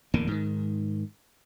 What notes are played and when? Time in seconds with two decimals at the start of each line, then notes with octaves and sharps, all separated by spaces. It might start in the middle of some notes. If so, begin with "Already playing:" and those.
0.14 D1 E2 D3 A#3
0.28 G#2 D#3